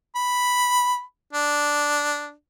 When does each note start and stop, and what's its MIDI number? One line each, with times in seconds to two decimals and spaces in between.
0.15 1.02 83
1.33 2.32 62